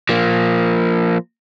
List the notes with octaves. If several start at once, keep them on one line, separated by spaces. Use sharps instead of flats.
F3 A#3